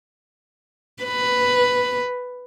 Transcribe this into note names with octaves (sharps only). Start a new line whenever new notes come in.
B4